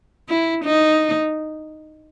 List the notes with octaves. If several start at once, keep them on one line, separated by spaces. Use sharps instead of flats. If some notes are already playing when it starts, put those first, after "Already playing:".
E4
D#4